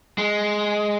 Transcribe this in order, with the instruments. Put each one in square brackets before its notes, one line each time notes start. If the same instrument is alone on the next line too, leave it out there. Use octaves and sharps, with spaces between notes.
[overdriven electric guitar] G#3